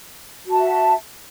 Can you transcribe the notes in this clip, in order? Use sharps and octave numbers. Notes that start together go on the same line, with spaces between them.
F#4 E5 A5